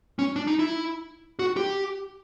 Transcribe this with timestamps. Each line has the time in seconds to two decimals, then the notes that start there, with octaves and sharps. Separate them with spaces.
0.19 C#4
0.36 D4
0.47 D#4
0.59 E4
1.39 F#4
1.57 G4